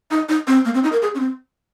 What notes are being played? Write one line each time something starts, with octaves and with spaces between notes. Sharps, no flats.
D#4
D#4
C4
A#3
C4
D#4
A#4
G#4
C#4
C4